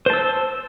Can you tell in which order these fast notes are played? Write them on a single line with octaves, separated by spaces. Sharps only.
C5 A5 E6